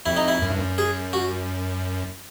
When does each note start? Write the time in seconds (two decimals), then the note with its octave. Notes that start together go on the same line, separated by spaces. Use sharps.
0.06 F2 E4
0.17 D#4
0.28 E4
0.42 F#2
0.50 G2
0.59 F#2
0.78 G#4
1.13 F#4